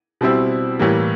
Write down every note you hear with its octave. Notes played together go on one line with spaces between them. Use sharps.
B2 G3 C4 E4
A2 E3 G3 A#3